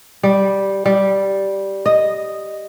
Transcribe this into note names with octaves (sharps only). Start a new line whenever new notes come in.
G3
G3
D#5